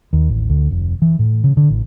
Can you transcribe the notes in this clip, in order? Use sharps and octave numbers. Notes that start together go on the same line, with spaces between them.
D#2
A1
D2
F1
E3
A2
C#3
D3
A1